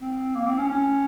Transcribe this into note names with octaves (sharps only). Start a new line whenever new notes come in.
C4
A#3
C4
C#4
C#4